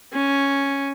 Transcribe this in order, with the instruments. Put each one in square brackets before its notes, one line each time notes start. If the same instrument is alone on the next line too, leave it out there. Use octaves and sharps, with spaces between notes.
[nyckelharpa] C#4